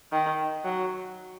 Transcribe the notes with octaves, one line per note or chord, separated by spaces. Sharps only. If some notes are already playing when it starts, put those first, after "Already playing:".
D#3
F#3